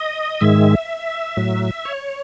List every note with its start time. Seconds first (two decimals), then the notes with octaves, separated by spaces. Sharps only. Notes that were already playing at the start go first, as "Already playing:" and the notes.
Already playing: D#5
0.41 G#2 D#3 G#3 E5
1.37 A2 F#3
1.85 C#5